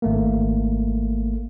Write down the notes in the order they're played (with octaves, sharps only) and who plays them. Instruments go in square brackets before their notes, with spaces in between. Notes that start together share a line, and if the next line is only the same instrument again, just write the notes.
[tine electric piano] G#1 A3 A#3